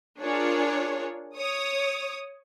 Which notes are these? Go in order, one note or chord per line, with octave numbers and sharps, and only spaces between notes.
D4 F4 G#4 A#4 C#5
C#5 D#6